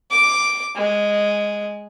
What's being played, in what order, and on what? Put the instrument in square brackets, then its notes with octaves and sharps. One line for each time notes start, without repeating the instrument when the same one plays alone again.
[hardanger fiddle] D6
G#3